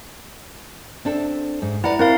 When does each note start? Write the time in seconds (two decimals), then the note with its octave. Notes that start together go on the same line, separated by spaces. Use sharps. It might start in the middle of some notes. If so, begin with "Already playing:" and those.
1.05 C4 D4 A4
1.62 G#2
1.84 E4 B4 D5 F#5 A#5
1.99 C4 E4 A#4 F5